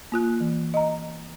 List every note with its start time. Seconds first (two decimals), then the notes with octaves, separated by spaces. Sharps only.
0.12 A#3 F4 F#6
0.41 E3
0.74 D#5 A#5